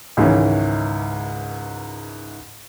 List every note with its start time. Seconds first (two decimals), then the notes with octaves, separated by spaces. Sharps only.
0.17 C#2 G#2 D#3 E3 C#4